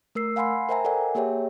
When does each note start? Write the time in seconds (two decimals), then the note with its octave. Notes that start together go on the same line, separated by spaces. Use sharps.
0.15 A3 A#4 E6 C7
0.36 F5 F#5 G#5 B5 C6 C7
0.69 A#4 C5 E5 G5 G#5 A#5
0.85 A4 A#4 D5 E5 F#5 G#5
1.15 A#3 G4 G#4 C#5 E5 G5